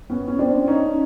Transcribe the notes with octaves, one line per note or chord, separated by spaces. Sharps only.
B3 C#4
C#4
C4 D4
C#4 D#4